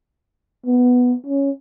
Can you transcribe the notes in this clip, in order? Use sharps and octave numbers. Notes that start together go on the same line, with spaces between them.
B3
C#4